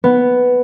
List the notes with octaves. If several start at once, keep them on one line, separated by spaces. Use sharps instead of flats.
B3